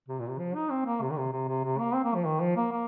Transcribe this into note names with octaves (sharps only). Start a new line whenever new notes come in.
C3
A#2
C3
F3
D#4
C4
A#3
C3
D#3
C3
C3
C3
C3
A#3
C4
A#3
F3
D#3
F3
A#3
A#3